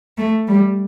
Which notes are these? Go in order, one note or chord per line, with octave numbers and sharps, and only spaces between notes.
A3
G3